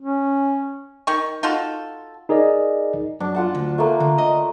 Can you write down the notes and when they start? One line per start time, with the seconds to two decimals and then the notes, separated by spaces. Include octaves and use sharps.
0.01 C#4
1.07 D#3 C#6
1.43 D#4 F4 F#4 A4
2.29 D#4 G#4 A#4 D5 D#5
3.20 F#2 D4
3.35 F4 F#5 A5
3.55 D2
3.78 A3 A#3
4.00 D3
4.18 D#5